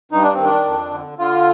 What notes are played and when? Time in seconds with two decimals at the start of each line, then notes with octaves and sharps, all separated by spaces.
0.12 G2 D#4
0.23 D4
0.34 D#3 C4
0.45 D4
0.65 F2
0.91 D3
1.19 D3 F4